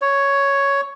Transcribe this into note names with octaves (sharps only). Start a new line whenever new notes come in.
C#5